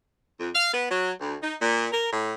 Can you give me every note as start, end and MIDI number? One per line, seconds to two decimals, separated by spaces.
0.40 0.50 41
0.55 0.71 77
0.74 0.88 59
0.91 1.12 54
1.21 1.36 38
1.43 1.55 63
1.61 1.88 46
1.92 2.12 70
2.13 2.34 45